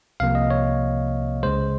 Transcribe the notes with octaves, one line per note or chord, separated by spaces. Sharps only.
C2 C3 F3 A#3 F5
D#5
C#5
C#2 C#3 G#3 C5